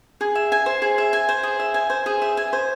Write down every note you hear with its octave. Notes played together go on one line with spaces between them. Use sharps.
G#4
E5
G#5
C5
G#4
E5
G#5
C5
G#4
E5
G#5
C5
G#4
E5
G#5
C5